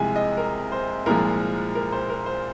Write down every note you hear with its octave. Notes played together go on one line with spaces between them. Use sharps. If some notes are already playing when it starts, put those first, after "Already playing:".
Already playing: C2 C3 F3 G#3 G#5
D#5
A#4
C5
C2 A#2 F3 G#3 A#4
A#4
C5
A#4
C5